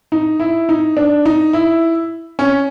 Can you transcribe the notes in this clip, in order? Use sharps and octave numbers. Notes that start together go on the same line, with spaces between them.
D#4
E4
D#4
D4
D#4
E4
C#4